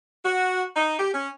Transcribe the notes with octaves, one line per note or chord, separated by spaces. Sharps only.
F#4
D#4
G4
C#4